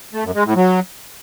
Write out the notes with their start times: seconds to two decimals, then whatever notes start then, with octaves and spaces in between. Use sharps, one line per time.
0.13 A3
0.24 F#2
0.34 G#3
0.45 A2
0.56 F#3